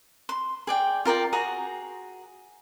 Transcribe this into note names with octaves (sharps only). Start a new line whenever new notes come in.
C6
G#4 D5 G5
F4 A#4 D5 G5
F#4 G#4 A#5